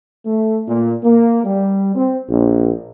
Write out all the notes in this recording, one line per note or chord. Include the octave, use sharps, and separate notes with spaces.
A3
A#2
A#3
G3
C4
A#1